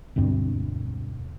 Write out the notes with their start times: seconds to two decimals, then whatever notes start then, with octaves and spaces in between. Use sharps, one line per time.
0.16 E1 D2 G2 C4